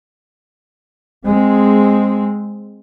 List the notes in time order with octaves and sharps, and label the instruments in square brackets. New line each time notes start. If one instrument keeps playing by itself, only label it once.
[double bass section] G#3 C4